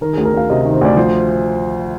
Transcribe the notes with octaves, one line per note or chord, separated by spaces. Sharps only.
D#3 A#4
D2 G#4
A#4
D2 F5
C3 D#5
D#3
C5
D2 D5
F3 C5